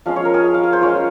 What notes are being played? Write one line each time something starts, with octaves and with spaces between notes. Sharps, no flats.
F3 G#3 C#4 F5
C#5
A#4
G#4
F5
F5
G#4
C5
G#3 C#4 F4 C#5